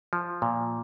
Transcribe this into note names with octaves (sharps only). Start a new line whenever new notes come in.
F3
A#2